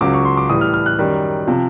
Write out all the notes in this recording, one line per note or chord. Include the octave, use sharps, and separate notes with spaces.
C#2 C#3 F#3 D6
C#6
C6
D6
A2 E3 G3 D#6
F6
F6
F#6
F#2 D#3 G3
C3 F3